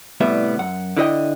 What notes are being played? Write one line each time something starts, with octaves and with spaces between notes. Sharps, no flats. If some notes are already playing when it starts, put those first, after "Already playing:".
C2 A2 G3 B3 E5
F#2 F#5
D3 E4 A#4 D#5 G5